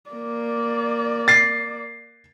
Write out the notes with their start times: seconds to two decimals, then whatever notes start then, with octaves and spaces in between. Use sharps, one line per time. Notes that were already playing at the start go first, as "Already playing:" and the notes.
0.10 A#3 D5
1.28 A6 C7